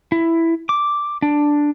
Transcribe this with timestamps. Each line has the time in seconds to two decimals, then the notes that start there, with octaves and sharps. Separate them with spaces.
0.12 E4
0.69 D6
1.22 D4